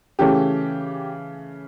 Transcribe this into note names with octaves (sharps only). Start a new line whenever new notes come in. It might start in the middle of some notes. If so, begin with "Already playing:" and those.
C#3 E3 A3 C#4 G4